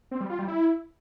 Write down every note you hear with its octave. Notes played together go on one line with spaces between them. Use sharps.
C4
G3
F4
G3
E4